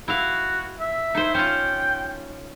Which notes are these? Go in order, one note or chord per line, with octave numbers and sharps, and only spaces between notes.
E4 F#4 F5
E5
D#4 E4 C5
C#4 F4 G5